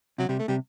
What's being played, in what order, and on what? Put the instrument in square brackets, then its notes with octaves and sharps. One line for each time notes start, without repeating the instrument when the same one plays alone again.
[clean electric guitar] C3 [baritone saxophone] F#3
[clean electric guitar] C3 [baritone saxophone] G3
[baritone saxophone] A3
[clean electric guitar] C3 [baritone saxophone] G3